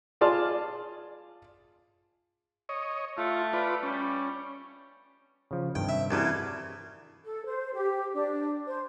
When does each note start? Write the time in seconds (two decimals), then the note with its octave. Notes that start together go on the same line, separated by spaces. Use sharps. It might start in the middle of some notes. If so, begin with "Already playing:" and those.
0.21 F4 G#4 D5 A5 C6 F6
2.69 C#5 D#5
3.18 A3 F4
3.53 F4 B4 D5
3.83 G3 C#4
5.51 C#3 F3
5.75 G2 C3 D#3 G5
5.89 E5
6.11 C2 C#3 E3 D4 F#4 A5
7.24 A4
7.45 C5
7.73 G4
8.14 D4
8.66 C5